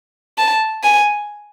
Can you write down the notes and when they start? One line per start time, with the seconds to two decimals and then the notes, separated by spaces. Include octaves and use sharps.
0.38 A5
0.83 G#5